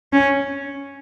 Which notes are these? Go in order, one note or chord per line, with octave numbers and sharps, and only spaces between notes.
C#4